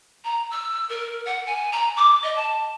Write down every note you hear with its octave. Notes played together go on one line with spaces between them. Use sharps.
A#5
E6
A#4
F#5
G#5
A#5
D6
D#5
A5